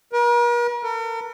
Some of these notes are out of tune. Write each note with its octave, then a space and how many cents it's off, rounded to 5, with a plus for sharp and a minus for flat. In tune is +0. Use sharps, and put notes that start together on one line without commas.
A#4 +45
A#4 -45